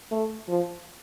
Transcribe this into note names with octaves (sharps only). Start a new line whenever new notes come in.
A3
F3